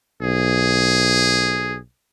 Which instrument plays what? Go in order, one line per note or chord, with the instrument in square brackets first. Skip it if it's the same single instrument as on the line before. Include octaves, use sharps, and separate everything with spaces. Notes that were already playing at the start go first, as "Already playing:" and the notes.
[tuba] B1 [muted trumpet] G#4